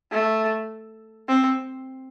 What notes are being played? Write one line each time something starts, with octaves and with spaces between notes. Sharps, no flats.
A3
C4